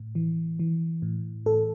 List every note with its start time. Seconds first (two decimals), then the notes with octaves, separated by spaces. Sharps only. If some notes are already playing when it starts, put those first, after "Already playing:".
Already playing: A2
0.15 E3
0.59 E3
1.02 A2
1.46 A2 A4